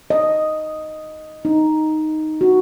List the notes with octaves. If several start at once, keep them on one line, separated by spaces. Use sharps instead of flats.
D#5
D#4
F#4